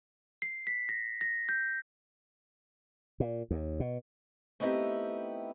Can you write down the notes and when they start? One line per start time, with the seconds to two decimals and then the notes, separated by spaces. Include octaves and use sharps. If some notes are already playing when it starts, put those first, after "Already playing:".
0.42 C7
0.67 B6
0.89 A#6
1.21 A#6
1.49 G6
3.20 A#2
3.51 D#2
3.80 B2
4.60 A3 B3 C4 D#4 E4 G4